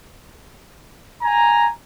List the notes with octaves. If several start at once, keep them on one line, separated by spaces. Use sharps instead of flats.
G#5 A#5